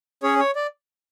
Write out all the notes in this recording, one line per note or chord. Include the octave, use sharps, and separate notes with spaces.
C#4 G#4 C#5
C#5
D5